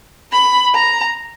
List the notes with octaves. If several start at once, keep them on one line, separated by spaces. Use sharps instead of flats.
B5
A#5